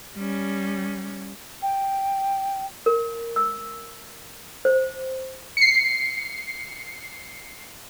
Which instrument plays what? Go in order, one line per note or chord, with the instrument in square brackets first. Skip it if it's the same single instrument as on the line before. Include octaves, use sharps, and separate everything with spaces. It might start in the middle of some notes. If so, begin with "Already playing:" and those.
[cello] G3 C#4
[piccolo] G5
[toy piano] A#4
E6
C5
[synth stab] C7 C#7